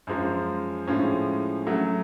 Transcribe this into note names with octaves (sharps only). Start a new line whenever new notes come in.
F#2 F3 G#3 C#4
A2 F3 G#3 C#4 G#4
F#3 A3 C#4